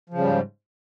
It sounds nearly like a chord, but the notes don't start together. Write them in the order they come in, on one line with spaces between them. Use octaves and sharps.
F3 C#3 G3 G#2